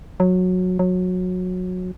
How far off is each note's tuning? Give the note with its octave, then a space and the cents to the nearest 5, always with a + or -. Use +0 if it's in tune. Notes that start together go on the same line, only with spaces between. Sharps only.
F#3 -15
F#3 -20